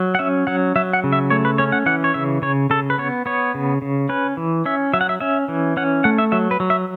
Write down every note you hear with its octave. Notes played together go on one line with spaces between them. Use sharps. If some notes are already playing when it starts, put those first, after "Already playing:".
Already playing: F#3
F#5
C#4 E5
F#3 F#5
F#3 E5
F#5
C#3
E5
A3 C#5
B4
C#4 C#5
F#5
E3 F#5
C#5
C#3 E5
C#3 C#5
C#3 A4
B4
B3 C#5
B3 C#5
C#3
C#3
C#4 B4
E3
C#4 E5
F#3 E5
F#5
E5
C#4 E5
E3
C#4 F#5
A3 F#5
E5
F#3 E5
B4
F#3
E5